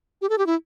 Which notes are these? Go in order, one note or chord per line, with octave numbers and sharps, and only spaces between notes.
G4
A4
G4
E4